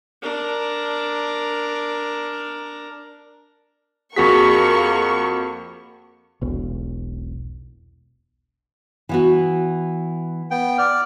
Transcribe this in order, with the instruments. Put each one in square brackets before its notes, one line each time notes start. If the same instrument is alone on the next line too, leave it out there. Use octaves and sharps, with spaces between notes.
[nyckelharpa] D4 A#4
[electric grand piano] F2 F#4 B6 [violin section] A#3 C#6 [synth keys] G#4
[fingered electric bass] E1 B1
[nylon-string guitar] E3 B3 F#4
[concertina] B3 G5
D5 F6